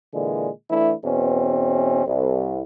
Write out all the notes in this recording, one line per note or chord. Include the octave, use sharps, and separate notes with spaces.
A#2 D3 E3 G#3
E3 A3 D4 E4
E2 B2 C4 C#4
C2